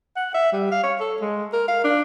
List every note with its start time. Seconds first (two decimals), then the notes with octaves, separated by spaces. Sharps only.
0.16 F#5
0.34 E5
0.52 G3
0.71 F5
0.83 C#5
1.00 A4
1.21 G#3
1.53 A#4
1.68 F5
1.84 D4